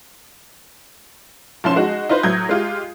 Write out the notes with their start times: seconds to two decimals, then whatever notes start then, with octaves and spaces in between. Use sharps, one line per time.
1.64 B1 F3 C#4 C6 E7
1.76 G#3 D#4 F#4
2.09 D#4 F4 B4 C5
2.23 A2 F#3 D#6 G6 G#6
2.49 G#3 F4 G4